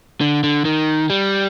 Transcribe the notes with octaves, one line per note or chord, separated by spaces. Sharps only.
D3
D3
D#3
G3